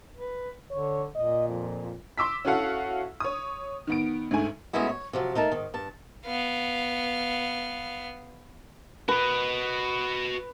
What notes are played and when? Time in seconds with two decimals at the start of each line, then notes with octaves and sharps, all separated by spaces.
0.17 B4
0.71 D3 C#5
1.15 A#2 D#5
1.48 F2
2.18 C6 D6 E6 B6
2.45 C#4 E4 F#4 A4 F5 F#5
3.20 C#5 D#6
3.87 D#3 B3 D7
4.31 D2 G#2 A3 G#5
4.73 G#3 A3 B3 C#4 E4 F#4
4.89 C#5
5.13 C3 F3 F#3
5.35 A3 D#4 A#4 A5
5.52 G#2 D#3
5.74 G2 A5
6.25 B3 F5
9.08 F#4 B4 D#5